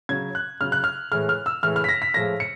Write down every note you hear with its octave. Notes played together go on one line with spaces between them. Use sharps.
C#3 F#3 G#6
F#6
C#3 F#3 F6
F#6
F6
A2 E3 G#3 F6
F6
E6
A2 E3 G#3 F6
F6
B6
A#6
B6
A2 F3 G#3 A#6
C#7